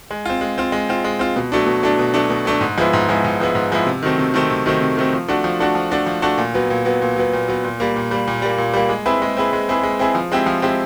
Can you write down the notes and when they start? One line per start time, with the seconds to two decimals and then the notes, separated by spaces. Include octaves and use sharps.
0.11 G#3
0.25 C4 F4
0.41 G#3
0.58 C4 F4
0.72 G#3
0.89 C4 F4
1.04 G#3
1.19 C4 F4
1.36 B2
1.52 F#3 A3 D4
1.66 B2
1.83 F#3 A3 D4
1.99 B2
2.14 F#3 A3 D4
2.30 B2
2.45 F#3 A3 D4
2.61 G#2
2.78 F3 G#3 B3 E4
2.93 G#2
3.09 F3 G#3 B3 E4
3.25 G#2
3.40 F3 G#3 B3 E4
3.55 G#2
3.72 F3 G#3 B3 E4
3.87 C3
4.03 D#3 F#3 A3 C4
4.19 C3
4.34 D#3 F#3 A3 C4
4.50 C3
4.66 D#3 F#3 A3 C4
4.81 C3
4.97 D#3 F#3 A3 C4
5.13 F3
5.28 A3 D4 F#4
5.44 F3
5.60 A3 D4 F#4
5.75 F3
5.91 A3 D4 F#4
6.06 F3
6.22 A3 D4 F#4
6.38 A#2
6.55 F#3 B3
6.70 A#2
6.85 F#3 B3
7.02 A#2
7.16 F#3 B3
7.33 A#2
7.48 F#3 B3
7.64 A#2
7.80 G3 A#3
7.96 A#2
8.11 G3 A#3
8.27 A#2
8.42 G3 A#3
8.58 A#2
8.74 G3 A#3
8.89 G#3
9.06 C4 E4 G#4 B4
9.22 G#3
9.37 C4 E4 G#4 B4
9.53 G#3
9.69 C4 E4 G#4 B4
9.83 G#3
9.99 C4 E4 G#4 B4
10.15 F3
10.32 G#3 C4 E4 G4
10.46 F3
10.62 G#3 C4 E4 G4